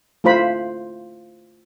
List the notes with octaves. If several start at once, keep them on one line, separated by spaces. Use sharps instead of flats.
A3 E4 F4 C5 B5